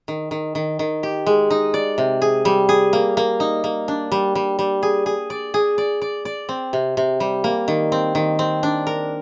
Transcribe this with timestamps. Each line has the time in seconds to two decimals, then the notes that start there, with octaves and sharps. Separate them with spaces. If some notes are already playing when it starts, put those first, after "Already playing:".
0.08 D#3
0.31 D#3
0.55 D#3
0.79 D#3
1.03 G4
1.26 G#3
1.51 D#4
1.74 D5
1.98 C3
2.22 G#4
2.45 G3
2.69 G#4
2.93 A#3
3.17 A#3
3.40 D#4
3.64 A#3
3.88 D4
4.12 G3
4.35 G3
4.59 G3
4.83 G#4
5.06 G#4
5.30 D5
5.54 G#4
5.78 D5
6.02 D5
6.25 D5
6.49 C4
6.73 C3
6.97 C3
7.20 G3
7.44 A#3
7.68 D#3
7.92 C4
8.15 D#3
8.39 C4
8.63 D4
8.87 A#4